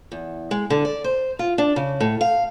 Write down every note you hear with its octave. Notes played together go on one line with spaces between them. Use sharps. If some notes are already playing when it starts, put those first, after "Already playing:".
E2
G#3
D3
D5
C5
F4
D4
C#3
A2
F5